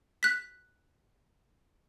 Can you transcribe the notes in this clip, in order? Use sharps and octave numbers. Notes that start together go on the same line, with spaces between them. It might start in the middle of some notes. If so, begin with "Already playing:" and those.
F#6 B6